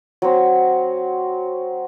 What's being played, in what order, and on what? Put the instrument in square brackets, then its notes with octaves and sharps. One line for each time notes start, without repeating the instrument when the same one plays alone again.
[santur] F#3 C4